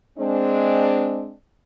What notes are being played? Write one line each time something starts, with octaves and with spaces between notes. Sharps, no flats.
G#3 C4 D4